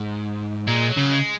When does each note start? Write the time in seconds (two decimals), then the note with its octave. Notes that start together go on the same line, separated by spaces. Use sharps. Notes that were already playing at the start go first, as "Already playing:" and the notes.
Already playing: G#2
0.67 A#2 G#3
0.90 F#3
0.97 C#3
1.12 G#3